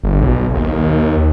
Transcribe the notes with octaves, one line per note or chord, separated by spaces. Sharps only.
G1
B1
D#2